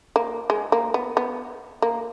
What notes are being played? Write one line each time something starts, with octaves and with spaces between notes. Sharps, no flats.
A#3
G#3
A#3
B3
B3
A#3